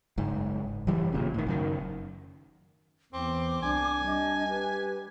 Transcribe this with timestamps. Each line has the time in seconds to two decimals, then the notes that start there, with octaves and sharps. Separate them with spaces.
0.18 F#1 G#2
0.87 F#1 F#2 E3 G3
1.13 G#1 A#2 C#3
1.34 A2 D#3
1.47 F#1 F#2 D#3
3.13 E2 C4 D6
3.63 C2 D4 D5 G#5
4.07 G3 D4 D#5
4.49 G4 B4